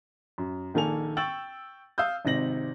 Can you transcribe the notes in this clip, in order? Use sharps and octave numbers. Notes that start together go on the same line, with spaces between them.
F#2
A#1 D#3 A#3 A4 G#5 F7
G5 C#6 E6 A6 F#7
F5 D#6 E6 G6
G#1 C3 D#4 A#6 F#7